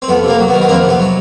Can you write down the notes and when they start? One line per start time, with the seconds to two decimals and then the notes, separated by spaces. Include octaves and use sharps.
0.02 C4
0.08 F2 B3
0.24 C3 A#3
0.39 F#3
0.48 B3
0.54 D#3
0.62 B3
0.68 F2 A#3 C4
0.84 C3 B3
1.00 F#3